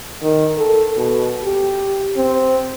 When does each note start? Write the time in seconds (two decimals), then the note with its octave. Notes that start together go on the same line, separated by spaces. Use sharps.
0.22 D#3
0.58 A4
0.97 B2
1.44 G4
2.16 C4